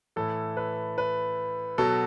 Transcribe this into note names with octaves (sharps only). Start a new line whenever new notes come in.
A2 E3 A4
B4
B4
B2 F#3 A4